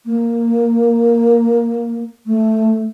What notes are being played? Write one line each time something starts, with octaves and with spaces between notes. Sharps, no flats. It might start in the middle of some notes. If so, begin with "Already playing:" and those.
A#3
A3